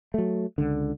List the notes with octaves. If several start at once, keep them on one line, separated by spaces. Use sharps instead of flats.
F#3 A3
C#2 D3